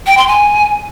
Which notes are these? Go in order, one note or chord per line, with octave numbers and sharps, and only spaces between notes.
G5
C6
G#5